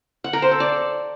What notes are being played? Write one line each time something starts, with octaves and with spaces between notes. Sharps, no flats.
F#5
A#4
C5
A4
D5